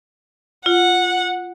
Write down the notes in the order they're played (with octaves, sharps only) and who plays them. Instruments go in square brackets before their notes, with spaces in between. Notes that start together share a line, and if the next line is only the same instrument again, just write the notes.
[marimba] F4 [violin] F#5